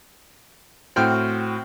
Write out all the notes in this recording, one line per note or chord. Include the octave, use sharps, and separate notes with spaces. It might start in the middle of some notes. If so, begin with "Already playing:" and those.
A2 C4 F#4 G5 F6